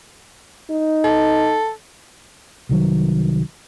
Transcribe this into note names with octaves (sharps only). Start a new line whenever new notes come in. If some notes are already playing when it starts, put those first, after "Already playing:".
D#4
A4
C2 D#3 F#3